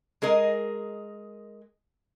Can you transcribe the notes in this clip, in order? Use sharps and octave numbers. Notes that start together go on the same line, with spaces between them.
G#3 G#4 A#4 D#5